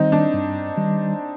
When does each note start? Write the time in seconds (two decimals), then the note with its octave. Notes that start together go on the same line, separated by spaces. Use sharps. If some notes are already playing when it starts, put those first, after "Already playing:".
Already playing: D#3 G3 C4 D#4
0.12 D4
0.34 G2
0.77 D#3 G3